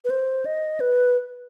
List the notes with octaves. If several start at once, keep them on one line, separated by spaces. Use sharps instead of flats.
B4
C5
D#5
B4